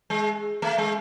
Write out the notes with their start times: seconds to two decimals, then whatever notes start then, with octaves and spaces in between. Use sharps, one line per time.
0.10 G#3
0.62 A3
0.78 G#3